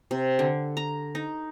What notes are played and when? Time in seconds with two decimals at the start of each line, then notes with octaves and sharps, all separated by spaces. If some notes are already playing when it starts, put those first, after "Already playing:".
0.11 C3
0.39 D3
0.77 A#5
1.15 D#4